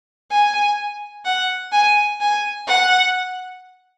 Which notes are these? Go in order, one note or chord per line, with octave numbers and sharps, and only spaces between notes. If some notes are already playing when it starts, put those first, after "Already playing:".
G#5
F#5
G#5
G#5
F#5